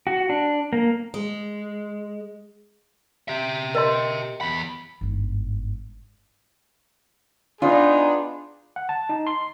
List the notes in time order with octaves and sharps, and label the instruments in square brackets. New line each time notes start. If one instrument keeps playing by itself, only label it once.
[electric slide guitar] F#4
D4
A#3
[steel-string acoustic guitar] G#3
[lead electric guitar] G4 E5
[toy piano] A#4 D#5 C6
[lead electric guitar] E2 B5
[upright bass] G1 G#2
[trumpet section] B3 D#4 G#4 [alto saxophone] D4 [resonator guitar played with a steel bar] F4
[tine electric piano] F#5
A5
D#4
C6